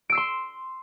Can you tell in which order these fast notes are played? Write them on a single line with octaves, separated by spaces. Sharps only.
D7 E6 C7 C6